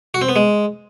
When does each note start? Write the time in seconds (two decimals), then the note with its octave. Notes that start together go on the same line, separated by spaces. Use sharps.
0.14 F#4
0.21 C4
0.29 B3
0.36 G#3